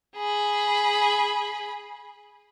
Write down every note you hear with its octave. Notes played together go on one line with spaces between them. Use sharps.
G#4 B5